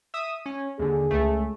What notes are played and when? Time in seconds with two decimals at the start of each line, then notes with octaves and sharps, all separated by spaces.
0.14 E5 D#6
0.46 C#4
0.79 D#2 D3 G#4
1.11 C#2 A3